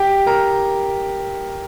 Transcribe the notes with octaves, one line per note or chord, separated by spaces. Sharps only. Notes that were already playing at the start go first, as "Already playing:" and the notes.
Already playing: G4 G5
A#4 A#5